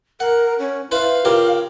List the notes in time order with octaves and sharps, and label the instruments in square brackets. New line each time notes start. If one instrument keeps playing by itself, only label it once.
[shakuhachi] A#4 [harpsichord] F#5
[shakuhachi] C#4
[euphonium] E4 [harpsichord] B4 C5 B5 [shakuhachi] F5
[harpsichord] C#3 G4 A#4 [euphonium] F4